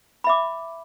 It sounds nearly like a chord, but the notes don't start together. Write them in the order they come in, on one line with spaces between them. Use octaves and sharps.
B5 E5 D6